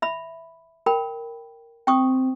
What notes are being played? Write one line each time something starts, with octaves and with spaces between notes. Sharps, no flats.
E5 B5
A#4 G5 B5
C4 G5 C#6 D#6